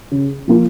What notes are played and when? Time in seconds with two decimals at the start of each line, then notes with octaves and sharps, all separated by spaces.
0.11 C#3
0.48 F3 A#3 F4